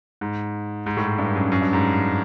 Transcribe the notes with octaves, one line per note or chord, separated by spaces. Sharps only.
G#2
G#2
A2
G#2
G2
F#2
F#2
G2
G#2